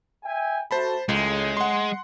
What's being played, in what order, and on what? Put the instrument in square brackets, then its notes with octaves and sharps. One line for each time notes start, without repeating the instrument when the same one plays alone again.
[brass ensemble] E5 G5 G#5
[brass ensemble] A3 F#4 [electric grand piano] C5 A5 B5
[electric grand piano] C#2 [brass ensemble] A2 C#3 [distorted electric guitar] G#3
[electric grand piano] F#5 C6